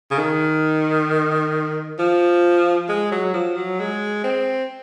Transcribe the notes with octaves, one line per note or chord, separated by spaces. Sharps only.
C#3
D#3
F3
G#3
F#3
F3
F#3
G#3
C4